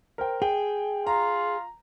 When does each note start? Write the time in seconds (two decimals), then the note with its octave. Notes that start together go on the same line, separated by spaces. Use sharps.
0.18 A#4 C5 G5
0.42 G#4 G5
1.07 F4 A#5